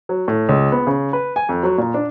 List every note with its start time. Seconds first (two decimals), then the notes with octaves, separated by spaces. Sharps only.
0.09 F#3
0.28 A2
0.49 C#2
0.72 B3
0.87 C#3
1.13 B4
1.36 G#5
1.49 F2
1.63 F#3
1.78 A#2
1.94 D4